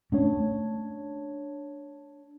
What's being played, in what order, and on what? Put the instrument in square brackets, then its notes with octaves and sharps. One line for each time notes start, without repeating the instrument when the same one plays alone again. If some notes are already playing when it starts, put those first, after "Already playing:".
[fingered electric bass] A3 C#4 [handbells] D4 C#5